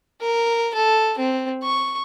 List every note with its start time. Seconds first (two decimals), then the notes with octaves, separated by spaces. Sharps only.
0.21 A#4
0.74 A4
1.18 C4
1.63 C#6